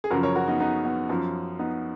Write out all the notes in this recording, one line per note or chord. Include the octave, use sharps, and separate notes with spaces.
G#4
F#2 C#3 F3 F#4 A#4
A#4 C#5
F#4 A#4
B3 D#4
B3 D#4
B3
F#2 F3
B3 D#4